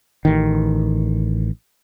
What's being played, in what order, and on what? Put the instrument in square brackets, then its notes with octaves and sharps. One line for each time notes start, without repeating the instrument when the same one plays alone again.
[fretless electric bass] A1 D#3